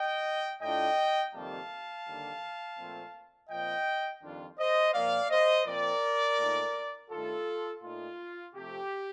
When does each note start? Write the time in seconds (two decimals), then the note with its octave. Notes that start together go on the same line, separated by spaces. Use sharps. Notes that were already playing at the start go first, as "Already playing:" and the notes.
Already playing: D#5 G5
0.62 A2 A3 D4 F4 D#5 G5
1.34 F2 C3 D#3 G3 A#3 F5 A5
2.06 D#2 D3 G3 A#3
2.78 A#2 F3 A3 C4 F4
3.50 A#2 F3 C4 D#5 G5
4.22 F2 D#3 G3 D4 F4
4.59 C5 D#5
4.94 A#2 F3 A#3 D5 F5
5.30 C5 D#5
5.66 A#2 F3 C4 A#4 D5
6.38 A#2 A3 D#4
7.10 G2 D#3 A3 F4 A4
7.82 A#2 A3 D#4 F4
8.54 C3 F3 A3 C4 G4